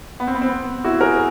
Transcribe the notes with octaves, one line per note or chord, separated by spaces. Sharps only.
B3
C4
B3
C4
B3
E4 F#4
G#4 A#4